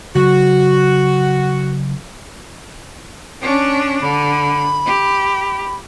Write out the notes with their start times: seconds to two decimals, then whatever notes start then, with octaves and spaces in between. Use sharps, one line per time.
0.15 C#3 F#3 F#4
3.41 C#4 D4
4.02 D3 B5
4.86 G4